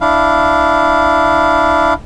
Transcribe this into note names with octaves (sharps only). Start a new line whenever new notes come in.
D4 E4 F5